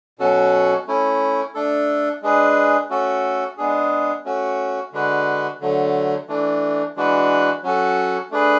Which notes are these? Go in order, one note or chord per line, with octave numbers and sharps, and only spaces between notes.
B2 F#3 C#4 F#4 A4
A3 C#4 E4
A3 D4 A4
G#3 D4 G#4 B4
A3 C#4 F#4 A4
G#3 B3 D4 G#4
A3 C#4 F#4
D3 G#3 D4 F#4 B4
D3 F#3 A3
E3 A3 D4
E3 G#3 D4 F#4 B4
F#3 C#4 F#4 A4
A3 D4 G#4 B4